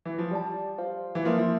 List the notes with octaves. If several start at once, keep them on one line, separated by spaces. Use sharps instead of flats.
E3
F3
G3 G4 D5 A5
F4 C5 F5
E3
F3 A#3 F4 A#4 E5
F3